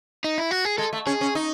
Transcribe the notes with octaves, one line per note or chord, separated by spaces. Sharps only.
D#4
E4
F#4
G#4
G#3 A4
A3
C#4 G#4
C#4
D#4